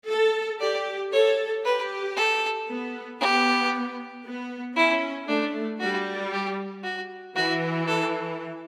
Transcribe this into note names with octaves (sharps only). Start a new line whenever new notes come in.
A4
G4 D5
A4 C#5
G4 B4
A4
B3
B3 G4
B3
C#4 E4
A3 D4
G3 F#4
G4
F#4
E3 F#4
A4